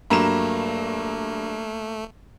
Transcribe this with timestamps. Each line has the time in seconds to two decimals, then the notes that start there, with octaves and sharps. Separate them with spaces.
0.10 G2 F#3 A3 A#3 A#5 B5 E7